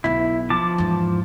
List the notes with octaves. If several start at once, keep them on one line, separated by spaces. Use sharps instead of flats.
B1 B3 E4
F3 A5 D6
E2 G#2